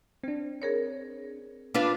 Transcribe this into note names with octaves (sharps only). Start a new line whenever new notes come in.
C4 D4
G#4 A#4 C#5
D4 F4 B4